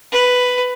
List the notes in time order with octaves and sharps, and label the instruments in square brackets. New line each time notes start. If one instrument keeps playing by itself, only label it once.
[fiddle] B4